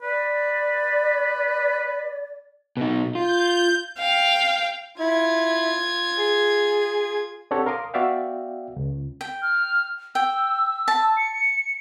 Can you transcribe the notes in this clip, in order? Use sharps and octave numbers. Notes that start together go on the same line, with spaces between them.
B4 D5
B2 D#4
F4 G6
F5 G5
E4 F4 G#6
G#4
C4 D4 G4 A4 C#5 F#5
A#4 F5 C6 D6 D#6
B3 F#4 D5 E5 F5 G5
C#2
G5
F6
G5 E6
A5
C#7